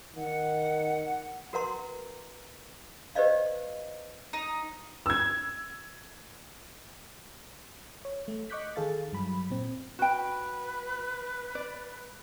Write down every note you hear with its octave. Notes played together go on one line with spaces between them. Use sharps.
D#3 F#5
F#4 A#4 B4 F#5 A#5 C6
G4 B4 C5 D5 D#5 F5
D#4
E6 G#6
C#5
A3
D#5 C#6 D6 F#6 G6 B6
D#3 G#4 A4 F5 A6
G2 F#3 B5
A#2 C4
F#4 B4 G5
D5